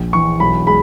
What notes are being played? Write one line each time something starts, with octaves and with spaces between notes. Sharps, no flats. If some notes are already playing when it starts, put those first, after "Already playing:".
Already playing: A#1
E3 C#6
B1 B5
G#3 B5